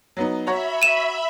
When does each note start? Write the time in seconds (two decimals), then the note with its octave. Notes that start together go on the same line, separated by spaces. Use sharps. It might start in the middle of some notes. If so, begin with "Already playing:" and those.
0.17 F#3 B3 D#4
0.47 F#4 C#5 E5 A#5 B5
0.82 D#7 E7